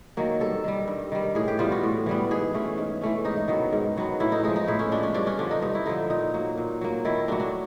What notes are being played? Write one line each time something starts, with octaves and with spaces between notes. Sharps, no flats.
D#3 F#3 A#3
G2 A4
D#3 G3
G2
D#3 G3
A2 G#4
G4
E3 G3 B3 F4
F#4
A2
E3 G3 B3
G#2 G#4
E3 A3 C#4
G#2
E3 A3 C#4
G#2 D#4
D#3 F#3 B3
G#2
D#3 F#3 B3
A2 E4
D#4
F3 G#3 D#4
D#4
A2 E4
C#4
F3 G#3 D4
C#4
G2 D4
C#4
D3 F3 D4
D#4
G2 D#4
E4
D3 F3 D#4
A#2 D#4
F#3 A#3
A#2
F#3 A#3
D#3 E4
F#3 A3 D4
D4